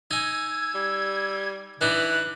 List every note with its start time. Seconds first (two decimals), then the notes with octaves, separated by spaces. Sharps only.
0.11 D#4 G#5 E6 G#6
0.75 G3
1.81 E3 D4 D#4 F#6